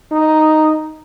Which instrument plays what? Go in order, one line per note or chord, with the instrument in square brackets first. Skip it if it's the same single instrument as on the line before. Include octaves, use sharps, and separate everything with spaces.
[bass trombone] D#4